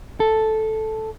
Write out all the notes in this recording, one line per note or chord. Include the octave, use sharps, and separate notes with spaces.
A4